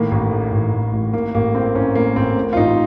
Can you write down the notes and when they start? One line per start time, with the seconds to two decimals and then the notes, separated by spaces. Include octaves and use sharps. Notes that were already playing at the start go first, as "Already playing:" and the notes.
Already playing: A2 D#3 A#3
0.11 A1
0.32 A2
0.52 A1
0.73 A2
0.93 A1
1.13 A2 A#3
1.34 A1 A#3
1.55 A2 C4
1.75 A1 C#4
1.95 A2 A#3
2.16 A1 C4
2.36 A2
2.53 F4
2.57 A1 D#4